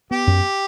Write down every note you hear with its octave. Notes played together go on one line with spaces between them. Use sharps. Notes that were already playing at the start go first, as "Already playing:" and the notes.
B3 G4
F#2